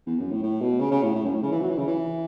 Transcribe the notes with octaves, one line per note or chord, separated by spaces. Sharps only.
E2
F#2
A2
A2
B2
C#3
C#3
A2
A2
F#2
A2
C#3
E3
F#3
E3
C#3
E3